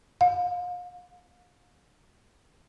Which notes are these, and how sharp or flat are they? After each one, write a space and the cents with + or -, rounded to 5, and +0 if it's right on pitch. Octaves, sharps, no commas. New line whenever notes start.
F5 +40